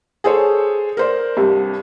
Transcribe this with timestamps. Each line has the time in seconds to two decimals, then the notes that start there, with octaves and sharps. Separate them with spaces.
0.24 G#4 A4 C5 C#5
0.97 A#4 C5 D5
1.37 C2 G2